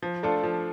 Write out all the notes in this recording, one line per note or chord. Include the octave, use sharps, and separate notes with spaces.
F3
A3 D4 F4 A4
F3